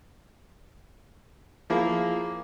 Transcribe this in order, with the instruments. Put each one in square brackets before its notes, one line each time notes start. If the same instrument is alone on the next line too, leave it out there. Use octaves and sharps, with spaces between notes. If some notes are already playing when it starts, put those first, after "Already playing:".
[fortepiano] F3 A#3 E4 G#4